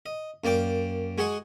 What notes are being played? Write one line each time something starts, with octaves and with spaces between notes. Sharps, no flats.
D#5
F#2 A#3 D5 G5 D6
G#3 F#4 G#4 D#5 F#5